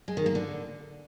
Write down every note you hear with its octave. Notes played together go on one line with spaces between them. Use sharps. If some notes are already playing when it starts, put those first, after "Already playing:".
G#3
D#3
A#3
D3